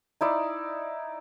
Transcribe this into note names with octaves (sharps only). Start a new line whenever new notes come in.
D#4 E4 D5